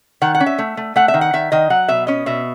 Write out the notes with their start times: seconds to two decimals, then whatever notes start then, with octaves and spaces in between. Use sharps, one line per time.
0.22 D#3 F#5
0.35 F#5
0.40 C#4
0.46 E5
0.58 A3
0.77 A3
0.96 A3 F#5
1.08 E5
1.14 D#3
1.21 F#5
1.33 D#3 E5
1.52 D#3 D#5
1.70 F#3 F#5
1.88 B2 E5
2.07 C#4 D#5
2.26 B2 E5